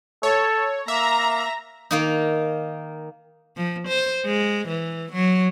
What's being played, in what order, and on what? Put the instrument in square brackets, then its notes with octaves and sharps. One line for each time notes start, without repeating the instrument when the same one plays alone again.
[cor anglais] A4 [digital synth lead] C#5
[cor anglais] A#3 [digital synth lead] E5 [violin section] A#5
[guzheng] D#3 A#3 D#4
[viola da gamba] F3
C5
G#3
E3
F#3